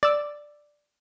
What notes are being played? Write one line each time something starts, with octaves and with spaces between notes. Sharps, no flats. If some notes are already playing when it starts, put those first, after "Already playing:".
D5 E6